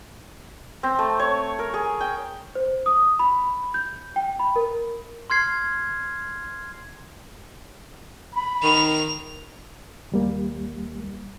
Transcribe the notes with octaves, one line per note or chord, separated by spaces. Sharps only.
C4
A3
C#5
A#4
G#4
G5
C5
D#6
B5
G6
G5
B5
A#4
C6 F6 G#6 C7
B5
D#3 F7
D#2 G3 A#3